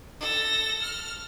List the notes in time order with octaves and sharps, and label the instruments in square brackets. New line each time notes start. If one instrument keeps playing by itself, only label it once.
[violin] A4 A#6
F6